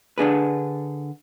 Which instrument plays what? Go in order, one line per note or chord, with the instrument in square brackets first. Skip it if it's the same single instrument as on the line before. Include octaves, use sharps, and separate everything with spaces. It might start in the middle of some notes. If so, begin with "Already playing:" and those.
[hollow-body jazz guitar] D3 D4 G#4 B4